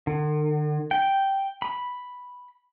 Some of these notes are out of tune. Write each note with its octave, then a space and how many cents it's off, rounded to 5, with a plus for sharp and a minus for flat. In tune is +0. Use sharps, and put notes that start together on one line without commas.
D3 +45
G5 -5
B5 +0